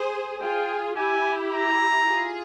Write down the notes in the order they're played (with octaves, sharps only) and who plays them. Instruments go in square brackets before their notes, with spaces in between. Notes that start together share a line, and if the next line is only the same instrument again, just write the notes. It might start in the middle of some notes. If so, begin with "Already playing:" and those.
Already playing: [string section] G#4 C5
[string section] F4 G#4 [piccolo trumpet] G5
[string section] E4 G4 [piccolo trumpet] G#5
[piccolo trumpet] A#5
[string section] F4 G#4